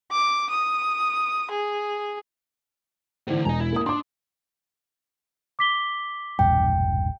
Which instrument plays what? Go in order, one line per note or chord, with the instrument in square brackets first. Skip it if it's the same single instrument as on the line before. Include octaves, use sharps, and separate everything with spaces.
[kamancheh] D6
D#6
G#4
[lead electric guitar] A2 D3 [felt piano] E3 C5
[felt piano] E1 G#5 [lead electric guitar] D#5 A#5
[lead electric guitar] E4
[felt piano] A#3 D#6
[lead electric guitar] D4 [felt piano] C6 D6
[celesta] D6 B6 G7
[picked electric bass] E1 A#1 G2 [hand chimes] G5